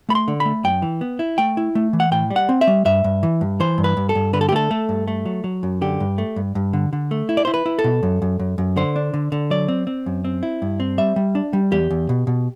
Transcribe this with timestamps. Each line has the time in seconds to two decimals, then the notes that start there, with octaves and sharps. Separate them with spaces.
0.09 A3 B5
0.15 C6
0.28 D3
0.40 B5
0.46 A3
0.64 F#2 G5
0.82 E3
1.01 B3
1.19 E4
1.38 A3 G5
1.57 E4
1.75 A3
1.93 E3
2.00 F#5
2.11 A2 G5
2.30 G3
2.36 F#5
2.49 C4
2.61 E5
2.67 G3
2.85 G2 E5
3.04 G2
3.23 E3
3.41 G2
3.60 E3 C5
3.78 G2
3.84 B4
3.97 G2
4.09 A4
4.15 G2
4.33 D3 B4
4.41 A4
4.49 G4
4.52 A3 A4
4.71 A3
4.89 G2
5.08 A3
5.26 F#3
5.44 F#3
5.63 F#2
5.81 D3 G4
6.00 G2
6.18 A3
6.36 G2
6.55 G2
6.73 D3
6.93 D3
7.11 A3
7.29 E4
7.37 D5
7.45 E4 C5
7.54 B4
7.66 E4
7.79 A4
7.84 B2
8.03 F#2
8.22 F#2
8.40 F#2
8.58 F#2
8.76 D3 C5
8.96 D4
9.14 D3
9.32 D3
9.50 F#3 D5
9.68 C4
9.87 C4
10.06 F#2
10.25 C4
10.43 E4
10.62 G2
10.80 C4
10.98 G3 E5
11.16 G3
11.35 D4
11.53 G3
11.71 E2 G4
11.91 E2
12.09 B2
12.27 B2